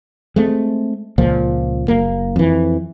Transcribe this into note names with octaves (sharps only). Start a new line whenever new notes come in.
G#3 A3 C4
C#2 A#2 F3
F#1 A#3
F2 E3